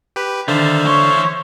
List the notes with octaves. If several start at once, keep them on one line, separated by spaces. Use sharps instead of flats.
G4 B4
D3 D#3 C5 E5 F5
E3 C#5 C6